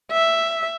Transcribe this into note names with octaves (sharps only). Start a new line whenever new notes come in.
E5